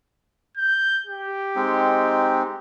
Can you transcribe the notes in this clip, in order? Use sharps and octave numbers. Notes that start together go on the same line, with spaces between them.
G6
G4
G#3 C4 D#4